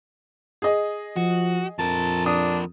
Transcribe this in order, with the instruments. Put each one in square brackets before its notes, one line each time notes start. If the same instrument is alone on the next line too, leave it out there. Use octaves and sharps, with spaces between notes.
[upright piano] G#4 D#5
[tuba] F3 [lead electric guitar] F#4
[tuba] F2 [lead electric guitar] F3 A#4 [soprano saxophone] A5
[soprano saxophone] D4 [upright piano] D#6